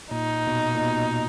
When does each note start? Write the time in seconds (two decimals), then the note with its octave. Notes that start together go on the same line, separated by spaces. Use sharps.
0.11 A#2 D#4
0.47 B2
0.75 A#2
0.83 B2